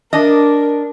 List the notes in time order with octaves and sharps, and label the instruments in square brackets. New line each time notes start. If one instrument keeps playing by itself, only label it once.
[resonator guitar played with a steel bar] D4 D#5 [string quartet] A#4